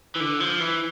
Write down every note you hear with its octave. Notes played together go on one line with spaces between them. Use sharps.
E3
D3
F3
E3